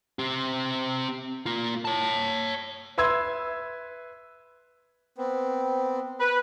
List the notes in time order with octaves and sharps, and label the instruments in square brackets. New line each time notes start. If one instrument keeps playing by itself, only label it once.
[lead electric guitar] C4 G4
A#3 F4
C#5 A5
[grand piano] B4 E5 C6 E6 G#6
[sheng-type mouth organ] B3 C4
[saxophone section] B4